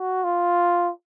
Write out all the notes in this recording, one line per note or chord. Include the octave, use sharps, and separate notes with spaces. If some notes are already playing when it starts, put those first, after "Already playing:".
Already playing: F#4
F4